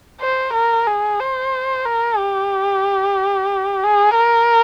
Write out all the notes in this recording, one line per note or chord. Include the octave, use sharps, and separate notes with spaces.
C5
A#4
G#4
C5
A#4
G4
G#4
A#4